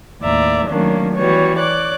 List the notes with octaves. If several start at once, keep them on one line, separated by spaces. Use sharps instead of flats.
D#2 A2 D5 E5 A#5
D#3 F#3 A3 A#3 C#4 D4
E3 G3 B3 F#4 C#5
C#5 D5 D6 F#6